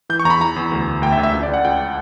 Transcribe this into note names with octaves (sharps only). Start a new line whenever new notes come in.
E3 G6
C#6
E2 A#5
B5
E3 A#5
E2
D2
D2
D2 G5
E5
D2
E5
C#2
D5
C#2
F#5
C#2 G5